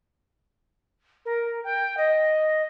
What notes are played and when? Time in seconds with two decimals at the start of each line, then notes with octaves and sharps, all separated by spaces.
1.25 A#4
1.64 G5
1.97 D#5